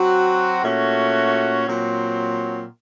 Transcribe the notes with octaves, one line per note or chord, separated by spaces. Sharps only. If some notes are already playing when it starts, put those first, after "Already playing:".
Already playing: F#3 C4 F#4
A#2 A3 C#4 F#4
A#2 F#3 C4